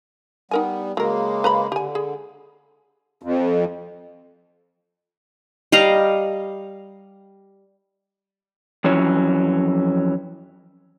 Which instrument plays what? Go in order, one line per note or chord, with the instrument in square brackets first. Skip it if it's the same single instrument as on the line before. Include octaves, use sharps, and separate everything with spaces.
[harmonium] G3 B3 [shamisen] D#4 A#4 G#5
[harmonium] C#3 G#3 A#3 [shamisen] F#3 A#4
[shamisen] B4 A#5 B5
[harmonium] D3 [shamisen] G4 G#5
[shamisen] G#4
[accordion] F2
[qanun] G3 D#5 F5 A#5
[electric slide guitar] F2 E3 F#3 C#4